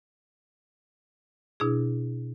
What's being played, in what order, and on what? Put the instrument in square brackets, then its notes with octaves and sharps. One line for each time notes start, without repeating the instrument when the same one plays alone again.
[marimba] B2 D4 E4 G#4